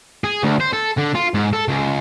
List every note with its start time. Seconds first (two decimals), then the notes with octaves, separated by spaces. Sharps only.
0.24 G#4
0.43 D2
0.60 C5
0.73 A4
0.98 D3
1.15 F4
1.34 G#2
1.53 A4
1.68 C#2